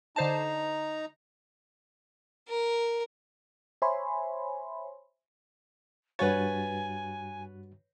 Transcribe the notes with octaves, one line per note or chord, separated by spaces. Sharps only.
D3 D#4 C5 A5 A#5
A#4
C5 C#5 E5 G#5 B5 C6
G2 F#4 B4 C#5 G#5 A6